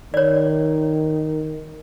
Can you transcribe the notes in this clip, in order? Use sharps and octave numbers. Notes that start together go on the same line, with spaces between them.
D#3 C#5 D5